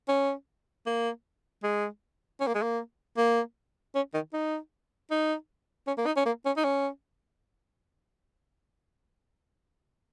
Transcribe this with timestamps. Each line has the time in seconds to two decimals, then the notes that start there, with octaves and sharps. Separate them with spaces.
0.08 C#4
0.86 A#3
1.63 G#3
2.40 C#4
2.47 A#3
2.55 G#3
2.62 A#3
3.17 A#3
3.95 C#4
4.14 D#3
4.33 D#4
5.11 D#4
5.87 C#4
5.98 A#3
6.06 D#4
6.17 C#4
6.26 A#3
6.45 C#4
6.57 D#4
6.64 C#4